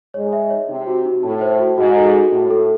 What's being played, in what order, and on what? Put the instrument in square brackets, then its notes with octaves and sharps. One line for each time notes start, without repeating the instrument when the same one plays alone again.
[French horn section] G#2 G#3 [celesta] C#5
[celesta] E5
C#5
[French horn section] C3 [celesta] D#4
[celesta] F#4
D#4
[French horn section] A2 [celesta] A5
[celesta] C5
F#4
[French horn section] G#2 [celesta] F#4
[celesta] A4
F#4
[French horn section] A2 [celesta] D#4
[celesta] A4